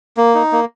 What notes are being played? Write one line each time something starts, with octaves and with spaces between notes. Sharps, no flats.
A#3
D#4
A#3